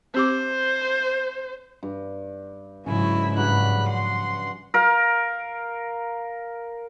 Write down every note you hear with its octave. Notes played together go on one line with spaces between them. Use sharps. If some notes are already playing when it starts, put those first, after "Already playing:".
C4 G4 C5 D6
G2
G#2 C#3 F#3 C#4 E4
G2 F3 F#3 B5 F#6
F#5 C6
A#4 F5